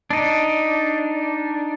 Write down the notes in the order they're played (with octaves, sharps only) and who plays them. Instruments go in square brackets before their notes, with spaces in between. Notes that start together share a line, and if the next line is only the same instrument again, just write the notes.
[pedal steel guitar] D4 D#4